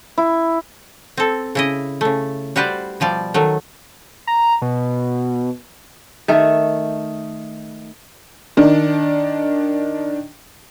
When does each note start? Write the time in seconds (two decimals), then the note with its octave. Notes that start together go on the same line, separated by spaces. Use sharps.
0.18 E4
1.17 C4 A4
1.55 C#3 E4 D#5
2.01 C#3 A3
2.56 G3 F#4 B4 C5 D5
3.00 B2 F3 G3 D5
3.34 D#3 F#3 A3
4.27 A#5
4.62 B2
6.28 D#3 A3
8.57 D#3 D4